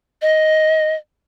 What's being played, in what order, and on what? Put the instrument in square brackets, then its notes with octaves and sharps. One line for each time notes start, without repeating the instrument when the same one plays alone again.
[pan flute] D#5